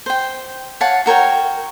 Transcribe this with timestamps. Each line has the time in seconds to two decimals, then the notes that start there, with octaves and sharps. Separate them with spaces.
0.06 C5 G5
0.81 C#5 F5 F#5 A5
1.06 F#4 A#4 C#5 G5